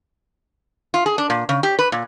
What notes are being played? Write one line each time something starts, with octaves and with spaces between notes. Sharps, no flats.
F4
G#4
D4
A#2
C#3
G4
B4
A#2